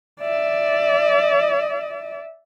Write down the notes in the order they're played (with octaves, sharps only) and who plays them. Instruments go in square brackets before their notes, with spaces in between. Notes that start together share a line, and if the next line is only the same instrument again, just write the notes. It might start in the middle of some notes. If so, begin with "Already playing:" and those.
[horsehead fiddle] D5 E5